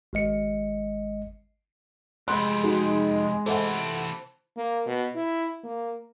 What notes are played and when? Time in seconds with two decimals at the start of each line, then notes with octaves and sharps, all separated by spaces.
0.13 G#1 G#3 D#5 C#7
2.28 F2 C3 G#3 B5 C6 F#6
2.64 D#4 F#4 G#4
3.46 C3 E3 A4 C5 E5 F#5 A5
4.57 A#3
4.86 B2
5.16 E4
5.64 A#3